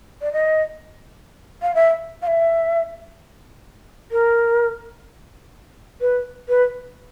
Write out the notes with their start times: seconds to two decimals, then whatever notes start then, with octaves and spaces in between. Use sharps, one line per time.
0.21 D5
0.33 D#5
1.62 F5
1.75 E5
2.22 F5
2.27 E5
4.11 A#4
6.01 B4
6.49 B4